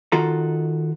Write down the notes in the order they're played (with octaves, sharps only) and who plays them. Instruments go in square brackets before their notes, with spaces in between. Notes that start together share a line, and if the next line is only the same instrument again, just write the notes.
[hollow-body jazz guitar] D#3 F4 F#4 A4 A#5